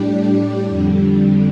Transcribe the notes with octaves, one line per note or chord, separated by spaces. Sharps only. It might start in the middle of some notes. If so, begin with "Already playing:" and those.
Already playing: A2 G3 D4 G4
F2 D3 G3